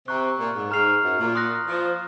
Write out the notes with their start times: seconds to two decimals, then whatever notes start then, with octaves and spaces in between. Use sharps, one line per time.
0.07 C3 A#5 C#6 F#6
0.39 A#2
0.56 G#2
0.71 G#2 A#5 F6 C7 F7
1.04 F#2
1.19 A#2
1.35 C6 D#6 F#6 A#6
1.67 F3